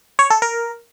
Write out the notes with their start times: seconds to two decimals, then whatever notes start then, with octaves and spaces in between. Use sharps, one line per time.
0.19 C#5
0.30 A4
0.42 A#4